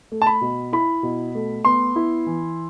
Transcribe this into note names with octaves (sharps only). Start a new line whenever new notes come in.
A3
A5
B5
B2
E4 B5
B2
A3
B3 C6
E4
E3